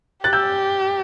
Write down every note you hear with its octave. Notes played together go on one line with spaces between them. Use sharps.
G4 F#6 A6
E6 G6